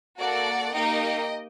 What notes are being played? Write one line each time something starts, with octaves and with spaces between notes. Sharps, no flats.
A#3 F#4 A4 D5 F#5
A#3 D#4 G4 D#5 G5